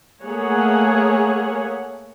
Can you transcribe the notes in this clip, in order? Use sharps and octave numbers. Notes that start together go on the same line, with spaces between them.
A3 A#3 G#4 C#5 F#5